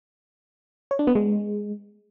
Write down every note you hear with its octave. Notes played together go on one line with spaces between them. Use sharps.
C#5
D4
B3
G#3